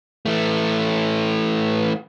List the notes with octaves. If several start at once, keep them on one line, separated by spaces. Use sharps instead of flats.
E3 A3